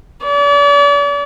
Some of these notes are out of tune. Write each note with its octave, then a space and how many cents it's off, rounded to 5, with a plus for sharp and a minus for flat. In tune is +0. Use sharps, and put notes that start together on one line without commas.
D5 -40